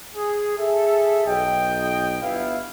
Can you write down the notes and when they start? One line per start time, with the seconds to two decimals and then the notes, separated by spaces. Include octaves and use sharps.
0.16 G#4
0.57 G#4 A4 E5
1.27 B1 D#5 G5
2.22 G1 B3 E4 F5